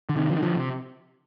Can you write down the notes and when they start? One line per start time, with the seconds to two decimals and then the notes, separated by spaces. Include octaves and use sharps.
0.09 D3
0.16 C3 D#3
0.29 D3 F3
0.36 D#3
0.42 D3 F3
0.56 C3